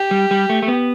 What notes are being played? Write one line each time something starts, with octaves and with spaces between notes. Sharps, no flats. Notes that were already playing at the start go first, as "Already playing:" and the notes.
Already playing: G4
G3
G3
A3
A3
B3